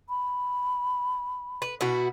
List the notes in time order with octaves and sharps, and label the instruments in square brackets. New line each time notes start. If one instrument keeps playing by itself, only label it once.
[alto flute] B5
[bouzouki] B4
B2 E4 F#4